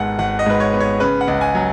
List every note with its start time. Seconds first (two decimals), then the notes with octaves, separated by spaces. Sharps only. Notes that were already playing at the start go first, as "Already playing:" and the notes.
Already playing: G#1 G#2 B3 F#5 G#5
0.19 G#1 F#5
0.39 D#5
0.46 G#2 B4
0.60 C#5
0.73 B3
0.80 C#5
1.00 C#3 B4
1.21 F#5
1.28 C#2
1.41 G#5
1.55 F#3